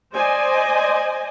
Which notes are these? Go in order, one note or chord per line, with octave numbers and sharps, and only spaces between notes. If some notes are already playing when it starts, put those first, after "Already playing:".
C5 D5 D#5 G#5